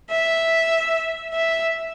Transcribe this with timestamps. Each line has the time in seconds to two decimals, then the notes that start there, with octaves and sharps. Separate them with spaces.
0.11 E5
1.34 E5